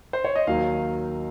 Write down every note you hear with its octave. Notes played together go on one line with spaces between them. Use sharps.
C5
C#5
D#5
D#2 D#3 F#3 F5